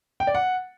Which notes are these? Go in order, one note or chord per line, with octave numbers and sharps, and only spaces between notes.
G5
D5
F#5